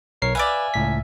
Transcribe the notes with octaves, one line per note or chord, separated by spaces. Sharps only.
B1 A#4 C#5 C7
B4 D5 E5 F5 G#5
C#2 A2 B6